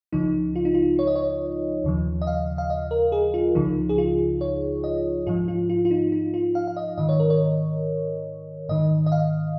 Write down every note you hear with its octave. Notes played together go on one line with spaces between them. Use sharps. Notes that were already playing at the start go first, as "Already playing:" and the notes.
C#2 C#3 F3 D#4
F4
D#4
F4
C#5
D#5
C#5
D#2 C#3 F3
D#5
F5
F5
D#5
A#4
G#4
F4
C#2 C#3 F3 D#4
G#4
F4
C#5
D#5
G#2 F3 F4
F4
F4
F4
D#4
D#4
F4
F5
F5
D#5
G#2 D#3 D#5
C#5
A#4
C#5
G#2 D#3 D#5
D#5
F5